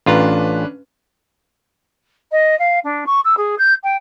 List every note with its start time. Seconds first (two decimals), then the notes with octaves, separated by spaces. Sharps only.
0.06 A1 C#4 D4 F4 B4 A#5
2.32 D#5
2.59 F5
2.84 D4
3.06 C#6
3.25 E6
3.37 G#4
3.59 G6
3.84 G5